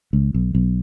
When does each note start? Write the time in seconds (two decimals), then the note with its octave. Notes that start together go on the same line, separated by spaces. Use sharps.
0.13 C#2
0.34 B1
0.55 B1